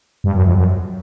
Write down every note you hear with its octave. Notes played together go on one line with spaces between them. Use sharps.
G2
F#2
F2
F#2